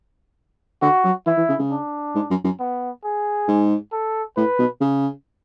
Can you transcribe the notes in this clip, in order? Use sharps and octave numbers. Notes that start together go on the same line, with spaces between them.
D3 F#4
F#3
E3 E4
E3
C#3
C#3
D4
G#2
F#2
F#2
B3
G#4
G#2
A4
A2 B4
B2
C#3